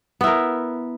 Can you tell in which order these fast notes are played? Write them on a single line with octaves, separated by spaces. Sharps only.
B3 E4 A#4